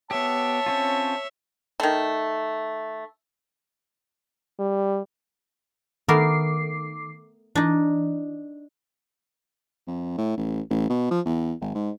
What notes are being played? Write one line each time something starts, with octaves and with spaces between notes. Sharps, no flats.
B3 G4 C#5 E5 A5
C4 C#4 F4
D#3 A3
G3
D#3 A3 B3 A#4 D6 C7
E3 D4 D#4
F2
A2
A1
A1
B2
F3
E2
G#1
G#2